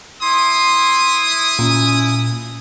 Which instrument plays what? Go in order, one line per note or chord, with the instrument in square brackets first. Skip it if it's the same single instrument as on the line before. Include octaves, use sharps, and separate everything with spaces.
[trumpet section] E4 D#6 [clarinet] C6
[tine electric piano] A#2 [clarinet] C#4